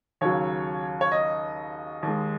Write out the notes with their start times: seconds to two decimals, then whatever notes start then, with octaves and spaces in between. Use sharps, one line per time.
0.21 D#2 C#3 F#3 C#5
1.01 C#5
1.12 D#5
2.03 D#2 D#3 G#3